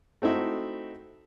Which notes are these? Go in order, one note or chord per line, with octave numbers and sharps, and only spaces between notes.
A3 C4 D#4 E4 F#4